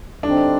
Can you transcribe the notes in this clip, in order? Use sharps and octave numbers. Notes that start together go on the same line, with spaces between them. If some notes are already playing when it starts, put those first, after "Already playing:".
D3 G3 C4 D4 D#4